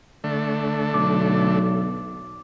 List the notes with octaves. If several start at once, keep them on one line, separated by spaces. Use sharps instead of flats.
D3 A3
B1 D6